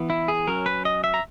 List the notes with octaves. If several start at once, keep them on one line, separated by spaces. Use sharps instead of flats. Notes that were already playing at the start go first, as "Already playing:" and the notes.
Already playing: E3 B3
E4
G#4
F#3 C#4 A#4
B4
D#5
E5
A#5